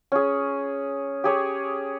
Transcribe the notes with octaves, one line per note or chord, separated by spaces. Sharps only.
C#4 G#4
G4 G#4 C#5